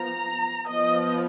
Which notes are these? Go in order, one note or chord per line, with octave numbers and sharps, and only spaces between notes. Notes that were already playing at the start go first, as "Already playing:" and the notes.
Already playing: F3 B3 A#5
F3 B3 D#5